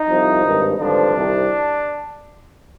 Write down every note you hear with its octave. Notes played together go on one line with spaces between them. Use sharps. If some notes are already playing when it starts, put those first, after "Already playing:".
Already playing: D#4
C2 C3 F3
G#1 G2 D#3
G#1 G2 D3 F3 D4
C2 C3 D#3